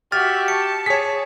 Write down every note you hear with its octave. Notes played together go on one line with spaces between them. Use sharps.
F#4 G4 E5 F6 A6
A5 C#7
G#4 C#5 B6